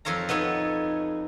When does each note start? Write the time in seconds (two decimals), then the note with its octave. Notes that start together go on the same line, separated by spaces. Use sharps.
0.05 F2 A4 C#5 F5 A#5
0.29 B3 D#4 A4 C#5